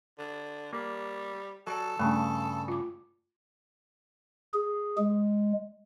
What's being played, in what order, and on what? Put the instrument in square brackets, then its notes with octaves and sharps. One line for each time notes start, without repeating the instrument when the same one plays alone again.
[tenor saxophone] D3
[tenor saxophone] G3 [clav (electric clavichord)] A#3
[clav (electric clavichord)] F#3 D5 [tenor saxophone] A4
[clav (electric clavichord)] G2 C#3 [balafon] A3 D4
[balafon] F4 D6
[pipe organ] G#4
G#3